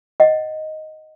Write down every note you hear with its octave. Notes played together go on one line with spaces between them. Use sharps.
D#5 F#5